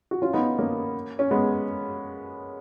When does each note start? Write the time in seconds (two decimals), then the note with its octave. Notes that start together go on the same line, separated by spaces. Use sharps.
0.11 F#4
0.22 C#4 F4
0.33 B3 D#4
0.58 A#3 C#4
1.19 C#4
1.31 G#3 B3